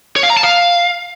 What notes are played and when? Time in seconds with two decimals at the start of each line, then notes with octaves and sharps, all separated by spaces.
0.16 C#5
0.23 F5
0.30 A#5
0.37 A5
0.44 F5